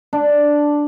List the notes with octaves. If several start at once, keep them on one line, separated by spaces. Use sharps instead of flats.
D4